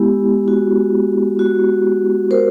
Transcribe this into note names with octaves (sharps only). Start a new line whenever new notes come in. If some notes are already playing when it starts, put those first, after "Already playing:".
Already playing: G#3 B3 E4 G4
F#4
F#4
A#4 C5